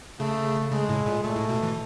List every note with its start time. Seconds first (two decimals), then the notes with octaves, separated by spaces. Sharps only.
0.20 C#3 A3
0.72 C#3 G#3
0.89 A2
1.06 A#2
1.23 A#2 A3
1.36 A2
1.49 B2
1.63 E3